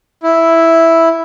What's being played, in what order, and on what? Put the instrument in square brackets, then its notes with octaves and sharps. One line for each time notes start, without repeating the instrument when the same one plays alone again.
[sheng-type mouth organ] E4